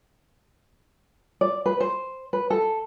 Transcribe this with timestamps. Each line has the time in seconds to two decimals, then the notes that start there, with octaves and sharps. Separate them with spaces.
1.41 D5
1.66 B4
1.80 C5
2.33 B4
2.50 A4